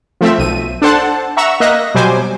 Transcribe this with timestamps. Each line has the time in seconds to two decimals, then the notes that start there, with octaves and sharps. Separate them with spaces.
0.21 F3 A3 C4 E5
0.38 B1 D#7
0.82 D4 A4 C5 F#5 A5
1.37 E5 F#5 A#5 C#6 E6
1.60 A#3 D#5 E5 F#6 A#6
1.95 B2 F#3 G3 C5 G#5 D6